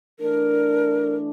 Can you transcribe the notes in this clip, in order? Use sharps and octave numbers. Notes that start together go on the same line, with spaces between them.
E3 A3 D4 A#4